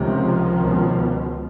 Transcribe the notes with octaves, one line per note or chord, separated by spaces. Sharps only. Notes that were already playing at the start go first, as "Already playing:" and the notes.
Already playing: C#2 C3 D#3 F3
C#2 B2